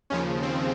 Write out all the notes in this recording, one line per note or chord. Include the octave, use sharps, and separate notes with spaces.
D#2 C#3 F3 C#4
C4